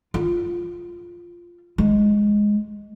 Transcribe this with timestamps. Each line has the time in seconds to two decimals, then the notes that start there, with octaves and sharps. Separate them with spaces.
0.14 F4
1.78 G#3